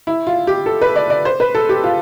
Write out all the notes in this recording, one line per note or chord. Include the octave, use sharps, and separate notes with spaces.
E4
F4
G4
A4
B4
D5
D5
C5
B4
A4
G4
F4